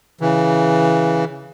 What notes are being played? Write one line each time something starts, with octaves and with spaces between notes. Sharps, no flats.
C#3 E3